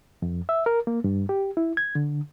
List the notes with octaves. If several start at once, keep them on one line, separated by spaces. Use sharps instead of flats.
F2
E5
A#4
A#3
G2
G4
E4
G#6
D3